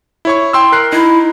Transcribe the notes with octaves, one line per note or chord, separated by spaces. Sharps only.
E4 C#5 C#6
G5 C6 E6
A#4 F#6 C7
D#4 E4